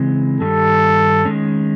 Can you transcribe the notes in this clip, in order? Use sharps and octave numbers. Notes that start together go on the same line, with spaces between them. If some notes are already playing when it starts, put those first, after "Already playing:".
Already playing: C#3 E3 G#3 C4
G2 D#3 G3 A4
D#3 G#3 C#4